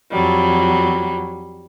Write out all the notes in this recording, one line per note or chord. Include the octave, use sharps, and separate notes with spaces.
F2 F#3 G3